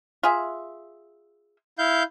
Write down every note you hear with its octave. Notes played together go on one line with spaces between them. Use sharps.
F4 G#4 E5
E4 F5 G6